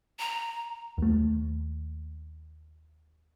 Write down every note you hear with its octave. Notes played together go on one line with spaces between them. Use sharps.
A#5
D#2 A3